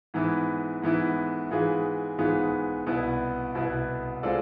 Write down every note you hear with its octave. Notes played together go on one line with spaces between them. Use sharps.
G#2 E3 B3 E4
G#2 E3 B3 E4
G#2 E3 B3 F4 G#4
G#2 E3 B3 F4 G#4
C2 B2 B3 E4 B4
C2 B2 B3 E4 B4
G#3 C4 F4 A4 D5